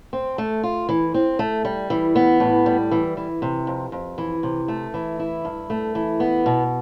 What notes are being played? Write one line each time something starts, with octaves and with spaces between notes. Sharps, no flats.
C4
A3
F4
E3
C4
A3
G3
E3
B3
A2
G3
E3
E3
C3
F2
F2
E3
C3
A3
E3
E4
G2
A3
E3
B3
B2